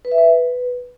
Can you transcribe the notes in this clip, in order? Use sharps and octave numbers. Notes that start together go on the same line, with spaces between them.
B4
E5
B4